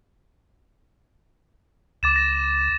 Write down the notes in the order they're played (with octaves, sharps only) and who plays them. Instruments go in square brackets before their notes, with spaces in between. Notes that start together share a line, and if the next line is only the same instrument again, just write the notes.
[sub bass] C#2 [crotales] D6 A6 E7
[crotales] A#6